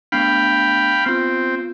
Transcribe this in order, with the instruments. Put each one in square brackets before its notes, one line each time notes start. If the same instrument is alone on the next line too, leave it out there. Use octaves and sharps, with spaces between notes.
[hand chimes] A3 B3 D4 [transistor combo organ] F5 G5 B5
[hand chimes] B3 F4 [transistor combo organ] C4